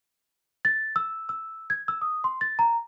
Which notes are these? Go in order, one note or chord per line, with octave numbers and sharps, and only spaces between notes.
A6
E6
E6
G#6
E6
D#6
C6
A6
A#5